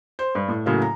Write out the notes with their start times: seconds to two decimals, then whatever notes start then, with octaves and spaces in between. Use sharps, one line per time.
0.19 C5
0.35 G2
0.48 A2
0.66 A2 C#3 F#3 A#3
0.82 A#5